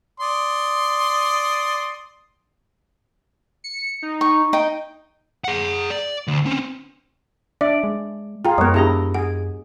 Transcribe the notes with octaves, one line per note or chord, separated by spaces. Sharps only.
D5 C6 D#6
C#7
D#4
D#4 C#6
D#4 G5
G#4 F#5
D5
D2
C4 C#4
D4 D5 E5
G#3
F4 G#4 G5 A#5
F#2 G#3 B3 A#4 C#5
D4 E4 G4 G#4 A#5
G#4 F#5